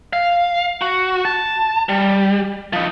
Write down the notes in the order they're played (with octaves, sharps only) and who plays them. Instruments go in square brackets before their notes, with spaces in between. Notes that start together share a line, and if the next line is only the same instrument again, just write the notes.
[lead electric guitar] F5
F#4
A5
G3
F3 D#4